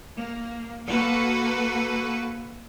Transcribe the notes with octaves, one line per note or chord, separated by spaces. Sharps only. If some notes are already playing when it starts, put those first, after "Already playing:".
A#3
A#3 F#4 A4 B4